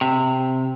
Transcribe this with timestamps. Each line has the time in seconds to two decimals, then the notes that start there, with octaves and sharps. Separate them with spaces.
0.01 C3